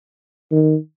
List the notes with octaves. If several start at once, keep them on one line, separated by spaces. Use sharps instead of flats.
D#3